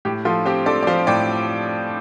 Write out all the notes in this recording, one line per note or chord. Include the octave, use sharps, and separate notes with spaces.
A2 G4
F3 F4 A4
C4 G4 C5
C4 A4 D5
D5
F3 C5 F5
A2 D5 G5